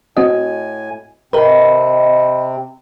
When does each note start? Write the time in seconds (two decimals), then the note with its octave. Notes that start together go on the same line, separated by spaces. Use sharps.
0.17 A2 C4 F#4 D#5 G#5
1.33 C3 C4 A#4 B4 D#5 B5